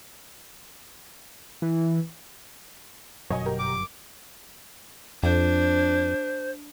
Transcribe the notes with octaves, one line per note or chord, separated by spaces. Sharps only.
E3
G1 F#2 B2 F#3 C#5 D#5 G#5
G4 A#4
D6
F2 D4 C5